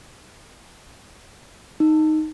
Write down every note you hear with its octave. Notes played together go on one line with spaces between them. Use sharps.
D#4